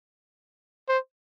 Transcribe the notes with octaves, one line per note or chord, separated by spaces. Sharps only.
C5